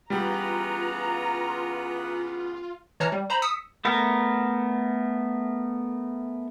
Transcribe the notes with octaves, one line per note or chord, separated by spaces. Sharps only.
C#3 E3 G3 B3 F4 A#5
E3 C#5 A5 A#5 F6
G3
C5 A#5 B5
D#6 E6 B6 C#7
A3 B3 A#4